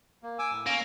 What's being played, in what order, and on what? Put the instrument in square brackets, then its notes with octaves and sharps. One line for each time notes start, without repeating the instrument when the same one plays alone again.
[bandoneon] A#3
G#5 D6 E6
A2
[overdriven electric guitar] A#3 [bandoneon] C#4